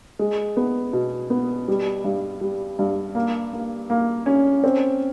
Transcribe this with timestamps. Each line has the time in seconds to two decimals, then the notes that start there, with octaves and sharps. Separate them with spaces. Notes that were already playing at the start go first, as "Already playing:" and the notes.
0.19 G#3
0.57 B3
0.93 B2
1.30 B3
1.68 G3
2.04 G2
2.41 G3
2.79 G2
3.15 A#3
3.53 A#3
3.90 A#3
4.26 C#4
4.64 C4